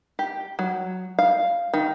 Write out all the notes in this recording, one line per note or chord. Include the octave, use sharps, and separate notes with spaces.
G4
F#3
F5
D#3